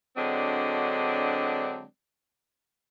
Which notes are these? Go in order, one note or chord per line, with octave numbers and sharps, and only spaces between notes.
D3 F#3 G#3 C4 D4